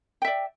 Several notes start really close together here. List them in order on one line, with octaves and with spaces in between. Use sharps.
G5 E5 D5